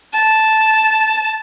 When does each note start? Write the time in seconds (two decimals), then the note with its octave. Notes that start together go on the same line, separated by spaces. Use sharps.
0.14 A5